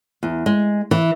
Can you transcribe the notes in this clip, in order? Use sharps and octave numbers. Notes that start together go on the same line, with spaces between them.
E2
G#3
E3